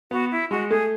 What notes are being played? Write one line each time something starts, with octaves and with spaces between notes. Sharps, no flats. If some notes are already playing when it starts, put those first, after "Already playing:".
B3 F#4
E4
G#3 F#4
A3 G#4